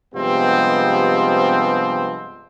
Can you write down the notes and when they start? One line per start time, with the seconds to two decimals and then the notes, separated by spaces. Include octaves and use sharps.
0.15 G2 C3 F3 G#3 B3 C4